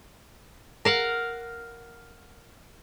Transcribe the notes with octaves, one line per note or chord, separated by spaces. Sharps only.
A#4 F5 F#5